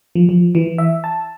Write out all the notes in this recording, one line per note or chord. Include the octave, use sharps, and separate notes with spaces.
F3
F3
E3
E5
A5